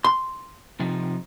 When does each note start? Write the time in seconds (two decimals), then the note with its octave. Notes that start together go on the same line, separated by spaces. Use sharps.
0.04 C6
0.80 C3 F3 D#4